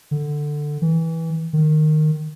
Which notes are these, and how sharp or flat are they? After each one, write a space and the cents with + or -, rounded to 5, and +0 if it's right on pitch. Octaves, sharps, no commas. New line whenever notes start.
D3 +10
E3 -15
D#3 -15